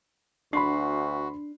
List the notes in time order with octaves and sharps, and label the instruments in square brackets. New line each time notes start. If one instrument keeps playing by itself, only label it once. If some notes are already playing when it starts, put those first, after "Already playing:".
[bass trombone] D2 [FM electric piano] D4 [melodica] F#4 [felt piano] B5 C6 C7